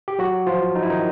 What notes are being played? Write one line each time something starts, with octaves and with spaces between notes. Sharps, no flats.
G4
F#3 F#4
F3 F4
D#4
E4
D#3 D#4